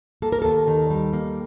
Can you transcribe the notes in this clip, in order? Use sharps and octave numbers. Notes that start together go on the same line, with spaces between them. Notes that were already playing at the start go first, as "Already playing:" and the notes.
A#3 A4
A#4
D#2 A4
D#3
G3
A#3